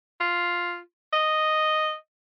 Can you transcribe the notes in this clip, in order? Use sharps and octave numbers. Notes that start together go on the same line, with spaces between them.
F4
D#5